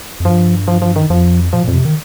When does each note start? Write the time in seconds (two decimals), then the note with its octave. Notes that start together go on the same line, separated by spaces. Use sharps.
0.20 F2
0.25 G2 F3
0.68 F3
0.82 F3
0.96 D#3
1.10 F2 F3
1.53 A#2 F3
1.64 F2 A#2
1.74 C3
1.85 D#3